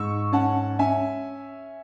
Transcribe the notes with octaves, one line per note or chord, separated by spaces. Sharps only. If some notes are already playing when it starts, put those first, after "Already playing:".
Already playing: G#2 C#6 E6
C#4 F#5 A5
C#4 E5 G#5